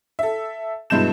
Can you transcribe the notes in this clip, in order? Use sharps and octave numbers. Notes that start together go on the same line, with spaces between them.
A4 E5
G2 B2 G#3 E4 G6 E7